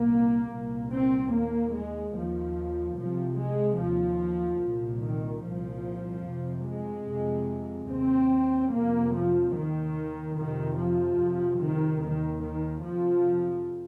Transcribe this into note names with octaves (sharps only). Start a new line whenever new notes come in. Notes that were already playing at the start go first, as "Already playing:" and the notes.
Already playing: C2 A#2 A#3
C2 A#2
C4
D#2 A#3
G#3
D#2 F3
C2 C3 F3
G#3
D#2 F3
C2 A#2
D#3
C2 A#2 F3
F2 C3
G#3
F2 C3
D#2 C4
F2 C3 A#3
F3
D#2 D#3
F2 C3 D#3
F3
F2 C3
D#3
D#2 D#3
D#3
F2 C3 F3